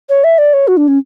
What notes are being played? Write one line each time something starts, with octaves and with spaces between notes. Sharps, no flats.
C#5
E5
D5
C#5
F#4
D4
C#4